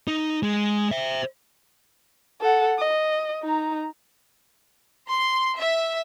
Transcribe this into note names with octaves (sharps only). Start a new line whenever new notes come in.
D#4
G#3
C5 E5
A4 F#5
D#5
D#4 A#5
C6
E5